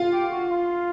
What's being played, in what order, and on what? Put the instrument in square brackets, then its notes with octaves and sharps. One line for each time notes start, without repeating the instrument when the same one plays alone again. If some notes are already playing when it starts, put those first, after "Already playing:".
Already playing: [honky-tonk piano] F4
[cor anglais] G4
F#4
F4